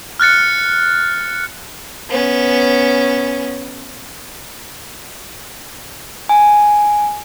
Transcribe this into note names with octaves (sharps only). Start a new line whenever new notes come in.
F6 F#6 A6 C#7
B3 C#4
G#5